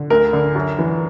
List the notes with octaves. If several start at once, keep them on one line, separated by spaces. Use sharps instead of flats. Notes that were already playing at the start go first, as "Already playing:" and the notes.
Already playing: D3
D2 A#4
D3
F#2
E3